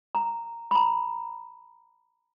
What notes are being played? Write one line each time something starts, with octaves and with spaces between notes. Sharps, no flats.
A#5
B5
A#5